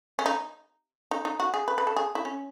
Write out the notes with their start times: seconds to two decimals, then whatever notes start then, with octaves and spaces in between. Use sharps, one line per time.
0.19 C#4
0.26 D#4
1.11 D#4
1.25 D#4
1.40 F#4
1.54 G#4
1.68 B4
1.78 B4
1.87 A4
1.96 G#4
2.15 E4
2.25 C#4